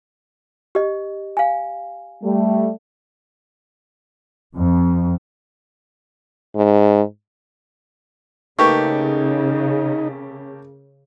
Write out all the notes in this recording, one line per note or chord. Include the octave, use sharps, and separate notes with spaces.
G4 D#5
F5 G#5
G3 A3
F2
G#2
C#3 A3 A#3 D#4 G4 B4 C#6